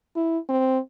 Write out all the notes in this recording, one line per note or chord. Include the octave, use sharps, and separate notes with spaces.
E4
C4